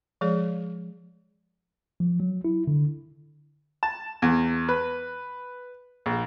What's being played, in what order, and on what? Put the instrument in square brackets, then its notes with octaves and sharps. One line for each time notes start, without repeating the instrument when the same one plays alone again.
[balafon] F3 G#3 G#4 D5
[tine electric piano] F3
F#3
E4
D3
[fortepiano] A5
E2
B4
A#1